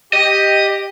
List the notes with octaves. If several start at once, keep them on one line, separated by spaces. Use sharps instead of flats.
G4 D#5